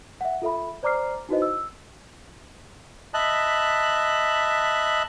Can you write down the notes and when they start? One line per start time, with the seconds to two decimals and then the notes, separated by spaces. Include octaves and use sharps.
0.21 E5 F#5
0.42 F4 A4 E5 B5
0.83 C5 D5 A#5 D6 F6 C7
1.29 D#4 E4 F#4 B4 C5 D#5
1.42 E6
3.14 D#5 E5 A5 B5 F#6